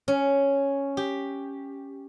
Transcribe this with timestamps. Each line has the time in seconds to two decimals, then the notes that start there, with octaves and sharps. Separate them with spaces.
0.08 C#4
0.97 G4